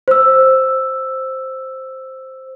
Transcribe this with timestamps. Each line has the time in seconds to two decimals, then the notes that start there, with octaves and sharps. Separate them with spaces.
0.08 C5 E6